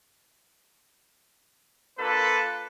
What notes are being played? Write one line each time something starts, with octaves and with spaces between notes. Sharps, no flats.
A#3 D4 F4 A4 B4